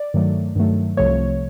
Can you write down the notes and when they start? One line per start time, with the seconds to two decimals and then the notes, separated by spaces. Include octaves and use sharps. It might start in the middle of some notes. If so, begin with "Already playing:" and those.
Already playing: D5
0.14 G2 D#3 F#3 A3
0.56 G2 D#3 F#3 A3
0.97 C2 C3 F3 A3 C#5